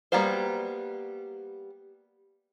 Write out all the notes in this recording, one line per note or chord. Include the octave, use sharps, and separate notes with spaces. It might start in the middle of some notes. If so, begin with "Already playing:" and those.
G3 A#3 B3 F#4 C5